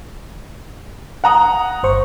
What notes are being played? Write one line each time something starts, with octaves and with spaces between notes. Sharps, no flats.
F#5 A#5 D#6
G1 C5 C#6